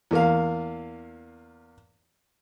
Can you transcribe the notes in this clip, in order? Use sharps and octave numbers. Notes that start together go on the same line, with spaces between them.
E2 A#3 F5